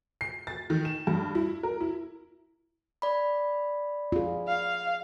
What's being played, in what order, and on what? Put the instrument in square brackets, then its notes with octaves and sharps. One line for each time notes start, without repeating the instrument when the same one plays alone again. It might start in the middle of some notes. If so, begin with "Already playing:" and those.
[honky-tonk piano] C7
A6
D#3
E7
G2
E4
A#4
E4
[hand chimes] D5 B5
[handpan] F4 G#4
[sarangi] F5